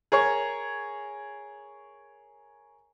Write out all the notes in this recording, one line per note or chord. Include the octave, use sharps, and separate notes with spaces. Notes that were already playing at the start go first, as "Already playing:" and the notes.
G#4 A#4 C#5 C#6